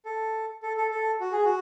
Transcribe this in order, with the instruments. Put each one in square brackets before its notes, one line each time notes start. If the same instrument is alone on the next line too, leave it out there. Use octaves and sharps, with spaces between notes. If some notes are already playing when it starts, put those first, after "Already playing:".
[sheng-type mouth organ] A4
A4
A4
A4
F#4
G#4
F#4